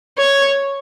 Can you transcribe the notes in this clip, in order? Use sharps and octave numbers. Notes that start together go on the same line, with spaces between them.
C#5